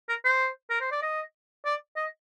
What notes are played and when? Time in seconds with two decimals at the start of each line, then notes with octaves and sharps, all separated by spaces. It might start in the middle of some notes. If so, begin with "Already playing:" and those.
0.09 A#4
0.24 C5
0.70 A#4
0.81 C5
0.91 D5
1.02 D#5
1.65 D5
1.96 D#5